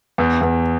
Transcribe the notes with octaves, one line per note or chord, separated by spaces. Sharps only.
E2
E2